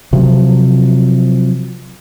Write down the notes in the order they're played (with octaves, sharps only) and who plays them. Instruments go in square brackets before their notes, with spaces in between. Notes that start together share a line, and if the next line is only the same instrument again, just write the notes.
[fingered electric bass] C3 F3 F#3